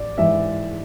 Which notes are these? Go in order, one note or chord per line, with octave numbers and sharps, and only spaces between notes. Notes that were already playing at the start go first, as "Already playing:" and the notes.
Already playing: A1 D5
G#2 E3 E5